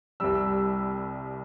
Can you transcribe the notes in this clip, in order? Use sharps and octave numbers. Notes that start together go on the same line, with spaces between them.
C2 C3 G3 E6